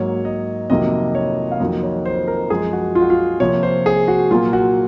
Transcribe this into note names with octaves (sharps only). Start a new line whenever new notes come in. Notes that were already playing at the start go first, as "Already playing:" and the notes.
Already playing: G#2 F#3 A#3 C#5
D#5
F2 C3 D#3 F#3 A#3 D#5
C#5
F5
F2 D#3 F#3 A#3 D#5
C#5
C5
A#4
F#2 F3 G#3 G#4
F#4
F4
F#4
F4
C3 F3 A#3 C#5
C5
G#4
F#4
A#2 F#3 A#3 F4
F#4